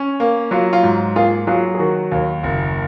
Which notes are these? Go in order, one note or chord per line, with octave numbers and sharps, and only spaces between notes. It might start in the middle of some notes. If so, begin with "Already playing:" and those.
Already playing: C#4
A#3
F#3 F4
F4
G#2
A#3 F4 G#4
F#3 F4 G#4
G#4
D#3 F#4
D#2
F#1